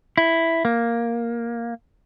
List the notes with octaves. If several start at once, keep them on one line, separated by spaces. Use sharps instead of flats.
E4
A#3